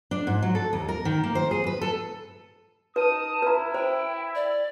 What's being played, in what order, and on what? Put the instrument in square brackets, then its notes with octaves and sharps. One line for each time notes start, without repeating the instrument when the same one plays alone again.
[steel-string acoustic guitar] D4
G#2
F#3
A4
D#2
A#4
D#3
A#3
C5
G#4
B4
A4
[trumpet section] D#4 D#6 [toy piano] B4 [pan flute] A5
[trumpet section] E4 [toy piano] B4 A#5
[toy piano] C5 [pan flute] G5
[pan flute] D5